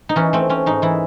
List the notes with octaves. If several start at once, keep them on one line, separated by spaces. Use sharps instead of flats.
D#4
E3 C#4
A3 C4
C4 C#4
G#2 D#4
E3 E4